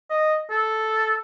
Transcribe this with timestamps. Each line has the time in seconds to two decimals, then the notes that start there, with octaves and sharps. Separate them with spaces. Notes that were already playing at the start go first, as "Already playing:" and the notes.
0.10 D#5
0.51 A4